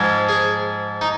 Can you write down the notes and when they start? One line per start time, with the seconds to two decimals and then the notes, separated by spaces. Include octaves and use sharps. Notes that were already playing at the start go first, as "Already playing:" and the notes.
Already playing: G#2 F3 G#3
0.29 G#4
1.01 D#4